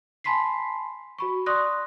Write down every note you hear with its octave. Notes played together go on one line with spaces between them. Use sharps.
G#5 A5 B5 C6 B6 C7
F#4 B5 C#6
D5 C6 C#6 D#6 F#6 A#6